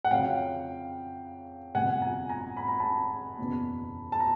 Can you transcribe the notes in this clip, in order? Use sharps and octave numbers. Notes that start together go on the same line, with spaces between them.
F#5
F2 C#3 F#3 F5 G5
G1 F2 C3 F#5 G#5
G#5 A#5
G#5 A#5
B5
A#5
A5 B5
F#1 E2 B2
A5
A#5